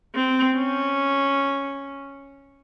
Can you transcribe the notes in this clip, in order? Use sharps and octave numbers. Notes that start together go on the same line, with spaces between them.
C4
C#4